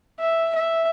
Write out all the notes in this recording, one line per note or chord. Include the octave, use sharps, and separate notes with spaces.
E5
E5